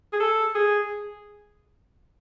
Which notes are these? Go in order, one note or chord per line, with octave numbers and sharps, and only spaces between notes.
G#4
A4
G#4